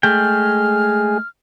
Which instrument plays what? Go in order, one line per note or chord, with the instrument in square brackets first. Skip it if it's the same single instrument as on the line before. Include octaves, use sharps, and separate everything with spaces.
[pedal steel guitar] G#3 A3 G5 [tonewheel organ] G#4 [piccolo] F6